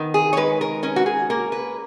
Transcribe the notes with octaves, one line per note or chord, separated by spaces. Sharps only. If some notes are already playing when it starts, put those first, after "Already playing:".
Already playing: D#3 B3
G#4
C#5
G#3 B4
A#4
C#4 A#4
F#4
G#4
A#3 A#4
B4